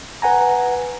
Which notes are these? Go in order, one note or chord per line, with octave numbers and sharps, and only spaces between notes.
B4 F#5 G#5 A#5